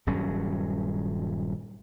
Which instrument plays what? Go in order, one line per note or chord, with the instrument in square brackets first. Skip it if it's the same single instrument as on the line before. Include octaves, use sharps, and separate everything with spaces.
[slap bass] D#1 G2 F#3 C#4